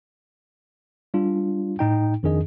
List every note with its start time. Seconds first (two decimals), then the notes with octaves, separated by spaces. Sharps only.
1.14 G3 D4 F4
1.79 A2 D#4 G5
2.23 F2 D#3 D4 G#4 D#5